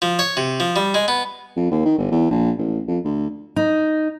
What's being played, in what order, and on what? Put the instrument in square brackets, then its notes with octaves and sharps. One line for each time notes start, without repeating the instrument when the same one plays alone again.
[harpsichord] F3
C#5
C3
F3
G3
G#3
B3
[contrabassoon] F2
D#2
D#3
G1
E2
A#1
A1
F2
D2
[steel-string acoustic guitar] D#4